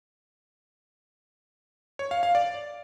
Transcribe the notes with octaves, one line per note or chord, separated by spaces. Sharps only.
C#5
F5
F5
D5